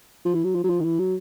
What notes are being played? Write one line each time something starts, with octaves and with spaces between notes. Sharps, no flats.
F3
E3
F#3
F3
F#3
F3
D#3
E3
F#3